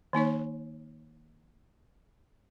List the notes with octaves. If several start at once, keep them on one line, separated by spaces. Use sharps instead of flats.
D#3 A#3 D#4 C#5